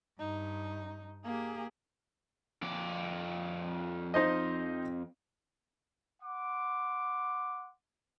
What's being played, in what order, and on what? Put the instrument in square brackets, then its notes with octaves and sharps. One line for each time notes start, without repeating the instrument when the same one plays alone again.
[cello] G2 [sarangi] D#4
[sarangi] A#3 [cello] G4 G#4
[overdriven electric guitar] F2 D5
[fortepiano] D#4 C5 D#5
[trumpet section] F#5 C6 D6